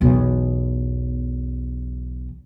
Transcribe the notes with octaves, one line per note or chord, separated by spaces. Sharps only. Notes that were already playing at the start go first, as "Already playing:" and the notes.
B1 E2